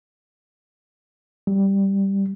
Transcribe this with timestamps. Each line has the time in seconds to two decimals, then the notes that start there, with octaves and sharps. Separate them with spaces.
1.47 G3